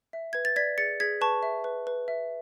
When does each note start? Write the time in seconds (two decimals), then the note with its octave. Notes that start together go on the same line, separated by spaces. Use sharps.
0.13 E5
0.33 B4 G#6
0.45 A6
0.56 D5 G#6 B6
0.78 G#4 A6 C#7
1.00 G#4 G#6 B6
1.21 B4 A5 C#6
1.43 E5
1.64 B4
1.87 B4
2.08 E5